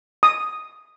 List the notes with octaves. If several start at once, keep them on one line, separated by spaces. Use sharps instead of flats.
D#6